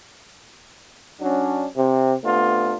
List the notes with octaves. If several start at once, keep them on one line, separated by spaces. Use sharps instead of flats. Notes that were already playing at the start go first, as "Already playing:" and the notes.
F#3 C#4 D4
C3
C3 A3 B3 D4 F4